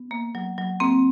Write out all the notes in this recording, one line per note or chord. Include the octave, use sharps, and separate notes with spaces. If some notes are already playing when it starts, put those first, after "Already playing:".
Already playing: B3
A#3
F#3
F#3
A#3 C4